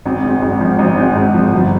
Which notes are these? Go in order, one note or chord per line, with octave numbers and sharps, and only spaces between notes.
G#1
G#2
G#1
F3
G#1
G#2
G#1
F3
G1